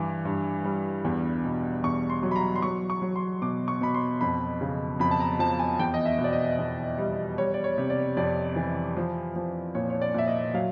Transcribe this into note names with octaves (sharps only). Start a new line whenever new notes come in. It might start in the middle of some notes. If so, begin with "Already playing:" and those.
Already playing: G2 E3 D6
G2
G3
E2
B2
E2 C#6
C6
F#3
B5
A#5
C6
F#3 C#6
C#6
F#3
C6
B2 D6
C#6
B2 B5
C6
F2 B5
C#3
F2 B5
A5
A#5
F3 A5
G#5
E2 G5
D#5
E5
B2
D5
D#5
E2
G3
G3 C#5
D5
C#5
C3
D5
F2 D5
E3
F3
F3
A#2 C#5
C#5
D5
A#2 E5
D#5
F#3 F5